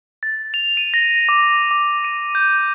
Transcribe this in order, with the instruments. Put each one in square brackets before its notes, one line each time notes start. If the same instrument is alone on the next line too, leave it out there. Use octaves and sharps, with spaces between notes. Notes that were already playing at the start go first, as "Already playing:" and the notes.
[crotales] A6
F7
D#7
A#6
D6
D6
D#7
G6